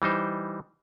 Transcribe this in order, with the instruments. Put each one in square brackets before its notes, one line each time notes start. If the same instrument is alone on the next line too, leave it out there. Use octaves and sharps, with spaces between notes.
[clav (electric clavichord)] E3 G3 D#4 C5